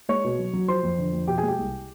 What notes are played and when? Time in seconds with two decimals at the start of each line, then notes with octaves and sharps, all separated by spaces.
0.09 G#3 C#5 C#6
0.24 B2
0.39 F#3
0.53 F#3
0.68 F3 C5 C6
0.83 F2
0.98 D3
1.13 F2
1.27 B2 G4 G5
1.38 G#4 G#5
1.43 G#3
1.48 G4 G5
1.58 C2